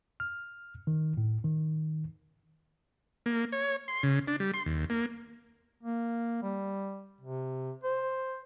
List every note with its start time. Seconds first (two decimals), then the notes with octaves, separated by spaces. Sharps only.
0.20 F6
0.87 D#3
1.17 A2
1.44 D#3
3.26 A#3
3.52 C#5
3.88 C6
4.03 C#3
4.27 D4
4.40 G3
4.54 C6
4.66 D#2
4.90 A#3
5.83 A#3
6.43 G3
7.21 C3
7.84 C5